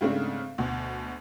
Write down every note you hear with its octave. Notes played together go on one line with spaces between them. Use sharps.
G#2 C#3 A3 C4 D4
D2 B2